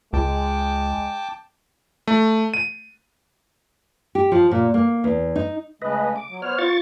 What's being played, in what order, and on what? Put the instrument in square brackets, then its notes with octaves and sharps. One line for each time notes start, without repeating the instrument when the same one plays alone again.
[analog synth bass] C#2 [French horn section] G#3 [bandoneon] G5 A5 D6
[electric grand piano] A3
D#7
[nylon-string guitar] G4
F3
A#2
A#3
E2
D#4
[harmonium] C#3 G#3 A3 [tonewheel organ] B4 D#5
[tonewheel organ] D6
[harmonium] F#3
[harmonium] B3 C5 [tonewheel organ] C#5 F6
[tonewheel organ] F4 C#6 A6